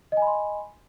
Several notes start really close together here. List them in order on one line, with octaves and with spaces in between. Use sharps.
D#5 G#5 B5 C6